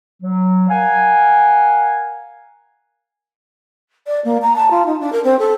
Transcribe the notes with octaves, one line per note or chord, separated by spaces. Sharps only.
F#3
A#4 F5 F#5 G#5
D5
A#3
A#5
A5
F4
D#4
D4
A#4
C4
A4